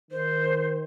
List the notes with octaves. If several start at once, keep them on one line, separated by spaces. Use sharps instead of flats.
D#3 C5